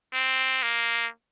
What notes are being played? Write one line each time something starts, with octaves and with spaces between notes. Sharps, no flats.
C4
A#3